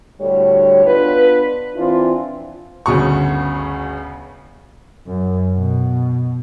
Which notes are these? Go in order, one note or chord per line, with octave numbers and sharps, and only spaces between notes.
D2 A2 D3 G3 C#5
B3 D4 F4 B4
E3 C4 D4 E4 F4
G1 D2 C#3 F#4 C#6
F#2
B2